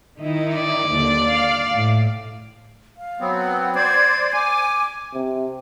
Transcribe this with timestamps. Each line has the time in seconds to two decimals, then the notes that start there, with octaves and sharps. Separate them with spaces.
0.19 D#3 D#4 E4
0.56 D5
0.90 D#2 D3
1.29 F5
1.74 A2
2.97 F5
3.20 F#3 B3 C4
3.35 F#5
3.75 C5 D5 G#6
4.33 G#5 D6
5.14 C3